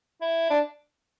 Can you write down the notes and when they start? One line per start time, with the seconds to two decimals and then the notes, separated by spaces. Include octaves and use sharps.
0.21 E4
0.50 D4